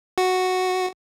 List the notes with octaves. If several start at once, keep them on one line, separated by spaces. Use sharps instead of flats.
F#4